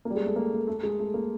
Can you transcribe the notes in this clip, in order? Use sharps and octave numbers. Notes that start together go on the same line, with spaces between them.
A#3
G3
G#3
A3
A#3
A3
A3
G#3
A3
A#3